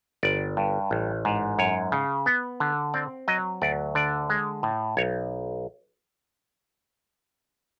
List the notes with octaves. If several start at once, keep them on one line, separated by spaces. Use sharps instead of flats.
G1 D5
G2
A1
G#2
F#2 C#5
C#3
B3
D3
C4 D5
F#3 D#5
D2 D5
D3 D5
G#3
A2
B1 C#5